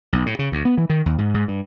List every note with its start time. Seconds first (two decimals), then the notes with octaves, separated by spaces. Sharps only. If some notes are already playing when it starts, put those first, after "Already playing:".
0.13 B1
0.26 A2
0.39 C#3
0.52 D2
0.65 B3
0.78 E3
0.90 D#3
1.06 D#2
1.18 G#2
1.34 G#2
1.48 G2